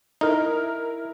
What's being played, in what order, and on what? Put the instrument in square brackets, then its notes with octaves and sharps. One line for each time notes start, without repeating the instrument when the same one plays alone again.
[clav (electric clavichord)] D#4 [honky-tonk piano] E4 A#4 F6